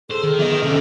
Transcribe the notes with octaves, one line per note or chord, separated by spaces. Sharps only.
G#4 A4 C5
D#3
E3 B3 D#5
C3 C#4 A4